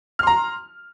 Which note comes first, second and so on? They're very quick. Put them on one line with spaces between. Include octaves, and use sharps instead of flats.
F6 C6 A#5